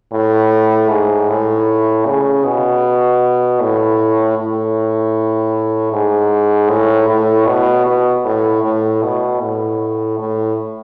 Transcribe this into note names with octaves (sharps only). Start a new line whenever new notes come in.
A2
G#2
A2
C#3
B2
A2
A2
G#2
A2
A2
B2
B2
A2
A2
B2
A2
A2